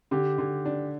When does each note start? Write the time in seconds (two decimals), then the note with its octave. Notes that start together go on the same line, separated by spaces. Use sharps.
0.11 D3 G4
0.38 D3
0.65 D4